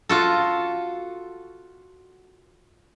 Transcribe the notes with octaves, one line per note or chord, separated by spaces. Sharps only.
F4 F#4 A4